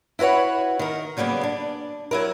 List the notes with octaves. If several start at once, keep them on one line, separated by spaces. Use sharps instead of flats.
E4 F#4 B4 C#5 F#5
D#3 A#4
C#3 F#3 G3 A#3 B3
D4
F#3 E4 A#4